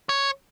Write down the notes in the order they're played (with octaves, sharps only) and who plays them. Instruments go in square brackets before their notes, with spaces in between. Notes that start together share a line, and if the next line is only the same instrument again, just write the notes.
[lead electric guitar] C#5